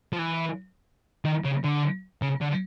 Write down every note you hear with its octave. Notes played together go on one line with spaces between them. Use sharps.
F3
E3
D#3
C#3
D3
C#3
D3